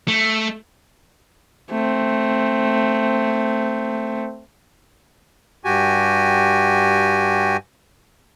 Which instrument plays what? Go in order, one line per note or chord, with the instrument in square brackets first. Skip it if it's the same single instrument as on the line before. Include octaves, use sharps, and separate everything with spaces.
[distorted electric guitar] A3
[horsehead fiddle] A3 C4
[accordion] G2 F#4 G4 G#5